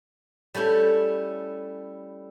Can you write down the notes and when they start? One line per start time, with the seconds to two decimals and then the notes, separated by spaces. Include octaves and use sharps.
0.54 G3 A3 C#4 E4